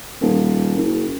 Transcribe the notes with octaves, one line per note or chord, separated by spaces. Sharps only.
D#1
F#1